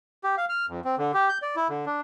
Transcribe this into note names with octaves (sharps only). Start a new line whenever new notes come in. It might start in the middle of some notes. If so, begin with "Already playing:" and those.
G4
F5
F6
F2
C4
D3
G4
G6
D5
E4
D3
D4